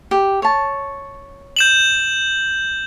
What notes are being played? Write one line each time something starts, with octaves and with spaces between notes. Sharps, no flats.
G4
C#5 A5
G6 E7 F#7